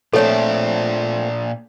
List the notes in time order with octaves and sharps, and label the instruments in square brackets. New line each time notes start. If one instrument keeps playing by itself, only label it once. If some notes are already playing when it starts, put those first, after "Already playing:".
[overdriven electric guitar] A#2 D4 [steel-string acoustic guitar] F3 A3 C4 [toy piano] A4 C#5